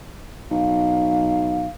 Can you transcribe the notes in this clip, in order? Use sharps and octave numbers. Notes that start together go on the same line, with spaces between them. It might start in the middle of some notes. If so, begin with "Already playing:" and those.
B1 F5